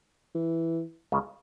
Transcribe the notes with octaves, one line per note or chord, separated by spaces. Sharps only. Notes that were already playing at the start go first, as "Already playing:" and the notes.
E3
C#2 C#3